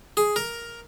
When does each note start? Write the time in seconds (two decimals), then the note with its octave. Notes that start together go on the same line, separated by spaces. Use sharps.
0.17 G#4
0.36 A#4